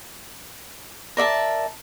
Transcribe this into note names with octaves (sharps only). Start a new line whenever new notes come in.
A#4 D5 E5 A5